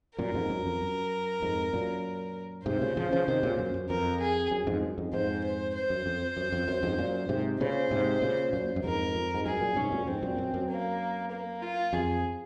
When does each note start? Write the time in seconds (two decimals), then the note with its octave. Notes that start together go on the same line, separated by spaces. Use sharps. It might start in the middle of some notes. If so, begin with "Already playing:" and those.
0.18 F#2 A#2 A#4
0.34 F2 G#2
0.50 F#2
0.66 F2
0.81 F#2
1.42 F2 G#2
1.73 F#2 A#2
2.65 G#2 C3 C5
2.81 A#2 C#3
2.97 C#3 F3
3.12 C#3 F3
3.28 C3 D#3
3.43 A#2 C#3
3.59 F#2
3.74 F#2
3.89 F2 A#4
4.20 G#4
4.51 F#2
4.67 F2 G#2
4.82 F#2
4.98 F2 G#2
5.13 F2 G#2 C5
5.44 C5
5.75 C5
5.90 F#2
6.06 F2
6.37 F#2
6.52 F2
6.68 F#2
6.83 F2 G#2
6.98 F#2 A#2
7.29 G#2 C3
7.60 A#2 C#3 C5
7.91 G#2 C3
8.22 A#2 C#3
8.53 F#2 A#2
8.76 F#2
8.84 F2 G#2 A#4
9.15 F2
9.35 G#2
9.46 F#2 G#4
9.61 F#2 A#2
9.76 G#2 C3 C#4
9.92 F#2 A#2
10.07 F2 G#2 C4
10.23 F#2 A#2
10.38 F#2
10.54 F#2
10.69 A#3
11.31 A#3
11.62 F4
11.93 F2 G#4